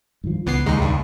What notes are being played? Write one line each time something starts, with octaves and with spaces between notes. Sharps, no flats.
G2 D#3 F3
C#2 E3 B3 C7
D#2 G#3 D#4
G2